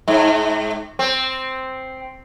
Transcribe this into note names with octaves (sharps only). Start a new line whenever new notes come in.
G#2
C4